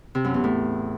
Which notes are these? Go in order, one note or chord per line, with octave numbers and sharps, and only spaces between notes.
C3
F#2
E2
A2